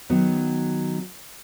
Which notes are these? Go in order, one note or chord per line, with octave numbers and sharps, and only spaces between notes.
D#3 F#3 B3